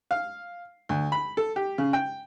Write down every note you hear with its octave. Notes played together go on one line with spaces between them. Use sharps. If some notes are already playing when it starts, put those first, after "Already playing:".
F5
D2
B5
A4
G4
C#3
G5